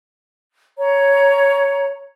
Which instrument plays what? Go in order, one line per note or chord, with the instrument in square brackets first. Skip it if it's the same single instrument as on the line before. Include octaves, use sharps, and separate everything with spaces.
[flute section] C#5 A#5